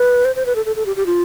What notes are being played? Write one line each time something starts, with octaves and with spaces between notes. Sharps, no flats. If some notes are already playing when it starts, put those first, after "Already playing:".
Already playing: B4
C5
C5
B4
A4
A4
A4
G4
G4
F4